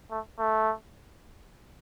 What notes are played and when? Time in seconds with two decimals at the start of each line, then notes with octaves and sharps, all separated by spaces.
0.11 A3
0.39 A3